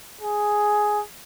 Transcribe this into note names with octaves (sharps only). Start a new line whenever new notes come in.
G#4